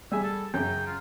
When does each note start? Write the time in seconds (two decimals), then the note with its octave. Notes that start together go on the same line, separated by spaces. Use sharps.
0.12 G3 G#4 E5 G#5
0.23 A4
0.54 F#2 C#3 G5
0.87 F4